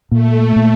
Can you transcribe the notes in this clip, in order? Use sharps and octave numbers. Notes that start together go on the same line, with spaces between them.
A#2 A3
A#2